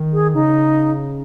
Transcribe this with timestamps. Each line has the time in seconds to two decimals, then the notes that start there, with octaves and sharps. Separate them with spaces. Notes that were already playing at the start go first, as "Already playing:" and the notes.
Already playing: D#3
0.13 G#4
0.34 C#3 D#4